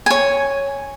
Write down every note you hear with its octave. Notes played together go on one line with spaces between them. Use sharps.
C#5 G#5